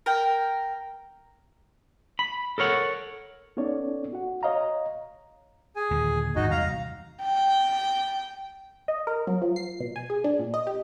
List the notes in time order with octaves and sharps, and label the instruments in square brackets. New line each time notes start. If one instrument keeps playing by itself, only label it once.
[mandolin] A#4 G5
[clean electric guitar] B5
A4 A#4 C#5 F#5
[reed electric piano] B3 C#4 D#4 A4 C#5 D5
F#4 F#5
C#5 D#5 F5 A#5
[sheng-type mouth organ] G#4 G#5
[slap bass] D#2 A#2 D3
[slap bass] G#1 F#2 [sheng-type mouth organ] D#4 F#4 D#5
[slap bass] E2 C3 G3 [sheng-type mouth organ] F5 A#5
[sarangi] G5
[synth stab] D#5
A#4
F#3
F3
C7
B2
G#5
G#4
D4
A#2
D#5
G4